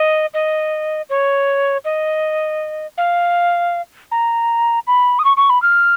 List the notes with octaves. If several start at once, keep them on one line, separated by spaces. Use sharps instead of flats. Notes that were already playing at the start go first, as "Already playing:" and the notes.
Already playing: D#5
D#5
C#5
D#5
F5
A#5
B5
D#6
C#6
C#6
B5
F6